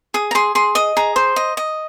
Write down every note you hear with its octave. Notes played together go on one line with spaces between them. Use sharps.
G#4 D#6
A#5
G#4 C6
G#4 C6
D#5 D#6
G#4 A#5
C5
D#5
D#5